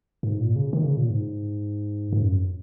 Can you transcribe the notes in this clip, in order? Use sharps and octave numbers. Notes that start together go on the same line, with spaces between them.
G#2
A#2
C#3
D#3
C#3
A#2
G#2
G#2
F#2